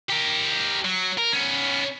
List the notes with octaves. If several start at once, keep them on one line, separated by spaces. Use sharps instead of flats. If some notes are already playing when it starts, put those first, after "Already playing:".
G4 A#4
F#3
A#4
B3 C#4